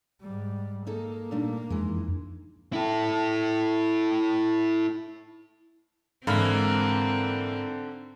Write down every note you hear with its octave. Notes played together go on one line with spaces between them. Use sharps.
G#2 G3
A#3 D#4 G#4 A4
A#2 G3 A3 D4 D#4
F2 E3 G#3
E4 A4
G#2 D3 E3 A#3 C4 B5 F6